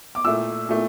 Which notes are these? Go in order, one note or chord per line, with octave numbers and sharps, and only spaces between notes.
D6
A#2 A3 E4 E6
A#2 A3 E4